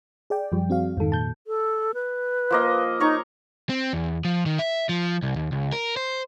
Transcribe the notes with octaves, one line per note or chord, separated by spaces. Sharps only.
G#4 D5 G5
F#2 F3 G3
C4 F#4 F5
F2 G#2 D#3 A4
A#2 A5 G6
A4
B4
F3 A#3 D#5
D#4 C#5 A#5 C#6
C4
E2
F3
D#3
E5
F3
C2
D#2
C#2
A#4
C5